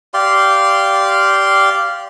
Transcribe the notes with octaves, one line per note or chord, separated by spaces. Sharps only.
G4 D5 F5 C6